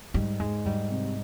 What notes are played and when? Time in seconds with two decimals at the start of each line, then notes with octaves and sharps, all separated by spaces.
0.14 G#2 G3
0.40 G#2 G#3
0.65 G#2 G3
0.90 C3